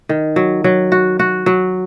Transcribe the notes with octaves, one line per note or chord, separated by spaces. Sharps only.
D#3
F#3
F#3
F#4
F#4
F#3